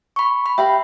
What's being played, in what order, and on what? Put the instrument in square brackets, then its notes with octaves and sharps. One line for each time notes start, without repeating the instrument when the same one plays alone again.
[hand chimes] B5 C#6
B5
[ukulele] G4 F5 B5 [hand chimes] E5